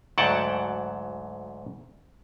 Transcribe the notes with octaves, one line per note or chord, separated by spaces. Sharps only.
D2 G#2 F#3 F#5 G5 A5